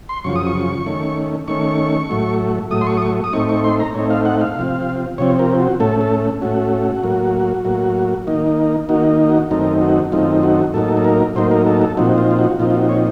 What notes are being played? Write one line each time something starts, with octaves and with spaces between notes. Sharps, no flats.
C6
F#2 C#3 F3 C#6
D#6
C#6
D#3 A3 C#4
D#3 A3 C#4 C#6
A2 F#3 A3
A2 F#3 A3 D#6
C6
C#6
D#6
C#6
D#6
A2 A3 C4 D#4 C#6
C#6
C6
A#5
A2 A3 C4 D#4 C#5
F5
F#5
F5
C3 F3 C4
C3 F3 C4 C#5
A#4
F#4
A2 A3 C#4 A4
A4
A2 A3 C#4 F#4
A2 F#3 A#3
A2 F#3 A#3
D#3 A#3 D#4
D#3 A#3 D#4 F#4
F#4
F#2 D#3 A3 C4 D#4 A#4
F#4
F#2 D#3 A3 C4 D#4 F4
F#4
A2 F#3 A#3 D#4 A4
A4
A#4
A2 F#3 A#3 D#4 C5
A#4
A4
A4
A#2 F3 C4 D#4 F#4
F4
F4
F#4
A#2 F3 C4 D#4 F4
F4
F#4
C#5